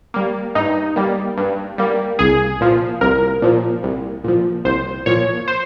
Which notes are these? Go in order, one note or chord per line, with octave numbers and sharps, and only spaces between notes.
G3 A#3
G2 D#4
G3 A#3
G2
G3 A#3
C2 G#4
A#2 F3
C2 A#4
A#2 F3
C2
A#2 F3
C2 C5
A#2 F3 C#5
C5